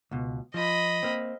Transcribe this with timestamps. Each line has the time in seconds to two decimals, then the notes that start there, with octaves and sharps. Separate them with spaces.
0.11 C#2 B2
0.54 F3 D#5 B5
1.03 A#3 C4